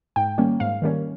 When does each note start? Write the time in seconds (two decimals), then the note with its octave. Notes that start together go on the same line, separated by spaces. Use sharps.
0.16 G#2 G5
0.38 D#3 G3 A#3 C#4
0.60 G#2 F5
0.82 D#3 G3 A#3 C#4